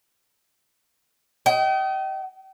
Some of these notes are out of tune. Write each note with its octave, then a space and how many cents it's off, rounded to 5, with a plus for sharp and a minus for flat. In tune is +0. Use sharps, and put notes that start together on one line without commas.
D#5 +15 G5 -40